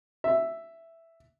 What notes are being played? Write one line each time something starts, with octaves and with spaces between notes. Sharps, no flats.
E5